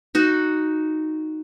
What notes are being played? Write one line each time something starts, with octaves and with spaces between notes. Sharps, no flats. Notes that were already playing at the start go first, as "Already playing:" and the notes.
D#4 F#4